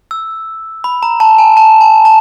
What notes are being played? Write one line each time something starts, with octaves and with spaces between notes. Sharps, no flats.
E6
B5
A#5
A5
G#5
A5
G#5
A5